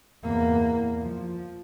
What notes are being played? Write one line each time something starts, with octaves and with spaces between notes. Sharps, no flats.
E2 A#3
F3